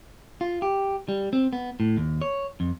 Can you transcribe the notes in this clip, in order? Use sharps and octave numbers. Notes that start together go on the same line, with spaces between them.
F4
G4
G3
C4
B3
A2
D#2
C#5
F2